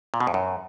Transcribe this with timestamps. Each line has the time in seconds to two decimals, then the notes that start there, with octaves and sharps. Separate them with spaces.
0.14 A#2
0.20 B2
0.27 F2
0.34 F#2